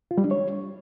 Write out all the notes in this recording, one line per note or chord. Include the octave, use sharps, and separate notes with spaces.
F4
G3
D4
C#5